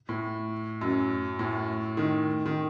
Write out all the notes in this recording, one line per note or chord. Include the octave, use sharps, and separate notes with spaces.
A2
F#2
A2
D#3
D#3